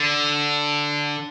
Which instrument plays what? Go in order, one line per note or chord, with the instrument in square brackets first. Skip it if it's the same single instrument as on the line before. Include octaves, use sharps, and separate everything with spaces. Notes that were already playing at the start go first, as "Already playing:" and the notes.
Already playing: [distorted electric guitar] D3